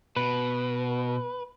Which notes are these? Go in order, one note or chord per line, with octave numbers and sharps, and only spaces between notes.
B2 B4